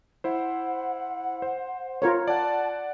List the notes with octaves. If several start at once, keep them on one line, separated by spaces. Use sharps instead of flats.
E4 C5 F#5
C5
F4 A#4 C#5
D5 F#5 A5